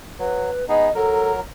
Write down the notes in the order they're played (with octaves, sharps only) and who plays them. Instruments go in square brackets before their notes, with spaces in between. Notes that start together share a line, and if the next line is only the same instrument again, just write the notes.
[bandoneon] F#3 [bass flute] B4
[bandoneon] B3 D#4 G#4 [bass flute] D#5
[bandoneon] F#3 A#4 [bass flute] A4